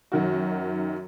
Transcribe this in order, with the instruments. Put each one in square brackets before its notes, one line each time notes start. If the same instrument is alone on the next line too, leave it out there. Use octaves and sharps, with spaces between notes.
[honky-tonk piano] F#2 D#3 F#4